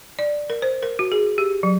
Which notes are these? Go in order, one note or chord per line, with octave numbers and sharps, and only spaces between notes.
D5
A#4
C5
A#4
F#4
G#4
G4
F#3